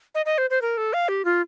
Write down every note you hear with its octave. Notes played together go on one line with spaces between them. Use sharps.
D#5
D#5
C5
C5
A#4
A4
F5
G4
F4